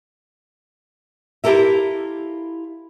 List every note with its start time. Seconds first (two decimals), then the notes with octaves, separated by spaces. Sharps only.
1.44 E4 F4 G4 A4 A#4 E5